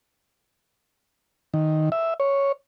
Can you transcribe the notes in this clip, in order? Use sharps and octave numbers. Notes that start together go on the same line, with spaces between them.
D#3
E5
C#5